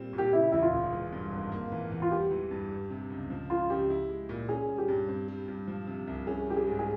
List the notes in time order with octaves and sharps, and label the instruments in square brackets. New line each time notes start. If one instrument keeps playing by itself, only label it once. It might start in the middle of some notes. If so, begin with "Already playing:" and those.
Already playing: [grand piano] A#2 G3 C4
A#2
[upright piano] G4
[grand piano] C#3 [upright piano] E4
[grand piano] E2 [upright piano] E4
[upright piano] F4
[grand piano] E1
E3
G2
G#1
A#3
E3
E2
[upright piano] F4
[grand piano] G3 [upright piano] G4
[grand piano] E3
G2
G3
C3
C#2
F3
[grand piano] C#3 [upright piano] F4
[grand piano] C#2 [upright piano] G4
[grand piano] E4
G#3
A#2
[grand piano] C#4 [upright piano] G#4
[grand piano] G3
[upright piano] G4
[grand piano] G2
C4
G3
G2
F3
C3
C2
[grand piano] C#4 [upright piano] G#4
[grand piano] G3 [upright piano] G4
[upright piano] G#4
[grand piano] G#2
[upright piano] G#4